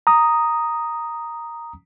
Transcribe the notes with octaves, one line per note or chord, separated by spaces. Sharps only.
A#5 D#6